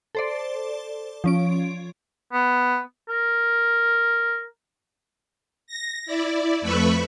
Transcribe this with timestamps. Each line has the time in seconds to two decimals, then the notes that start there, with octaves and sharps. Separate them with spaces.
0.15 A4 C5 D5
1.24 F3 C#4 D7
2.33 B3
3.09 A#4
5.67 A#6
6.06 E4 D5
6.62 F2 A3 B4 E5 B5 C#6